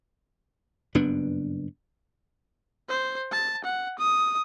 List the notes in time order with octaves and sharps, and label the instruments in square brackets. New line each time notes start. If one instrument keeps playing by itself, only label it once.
[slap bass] F#1 G2 B3 D4
[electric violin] C5
A5
F#5
D#6